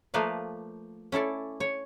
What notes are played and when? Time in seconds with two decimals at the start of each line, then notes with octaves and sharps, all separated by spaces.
0.14 F3 A3 A#3 B4 D5 F5
1.12 C#4 E4 A4 D5
1.60 C#5